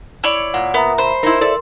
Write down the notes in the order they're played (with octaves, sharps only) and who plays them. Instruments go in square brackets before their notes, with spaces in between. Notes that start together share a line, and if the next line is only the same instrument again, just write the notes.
[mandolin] E4 C#5 D5
[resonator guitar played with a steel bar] A#2 [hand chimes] F#5
[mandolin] B3 [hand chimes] A#4 E5 A#5
[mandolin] C5 [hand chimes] B5
[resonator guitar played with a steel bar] D#4 E4 [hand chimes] A#4 C6
[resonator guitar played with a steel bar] A4 D5 E5